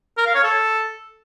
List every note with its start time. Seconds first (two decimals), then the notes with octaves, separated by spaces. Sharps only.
0.17 A#4
0.26 F5
0.35 C#5
0.44 A4